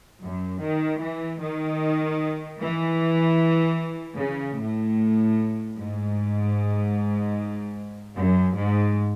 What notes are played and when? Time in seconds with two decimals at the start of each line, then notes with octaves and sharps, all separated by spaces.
0.21 F#2
0.60 D#3
0.99 E3
1.40 D#3
2.58 E3
4.17 C#3
4.58 A2
5.76 G#2
8.15 F#2
8.54 G#2